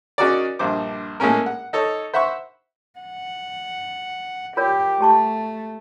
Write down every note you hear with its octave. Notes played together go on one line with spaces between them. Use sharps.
C#4 D#4 F#4 G#4 A#4 D5
A#1 G2 C5 D6
A2 G#3 A#3 C#4 A#4
F#5
D#4 A4 C#5
C5 E5 F#5 B5 C#6
F#5
F4 G4 A#4 C#5
A3 G4 A5 C#6